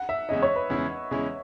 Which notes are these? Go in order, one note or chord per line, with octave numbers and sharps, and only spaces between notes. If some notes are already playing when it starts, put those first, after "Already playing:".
Already playing: F#5
E5
E2 C#3 G#3 C#4 E4 D#5
C#5
B4
E2 C#3 G#3 C#4 E4
E2 C#3 G#3 C#4 E4